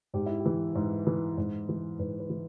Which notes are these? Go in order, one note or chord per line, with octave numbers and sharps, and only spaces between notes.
G#2 G4
E4
G4
E3
G#2
E3
G#2
E3
G#2 B4
B4
E3